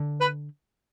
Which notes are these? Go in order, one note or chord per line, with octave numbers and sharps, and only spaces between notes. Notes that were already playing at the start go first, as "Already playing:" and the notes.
Already playing: D3
B4